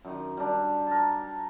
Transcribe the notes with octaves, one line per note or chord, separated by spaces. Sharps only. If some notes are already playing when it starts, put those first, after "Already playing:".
F#2 D#3
G3 D4
A#4 A5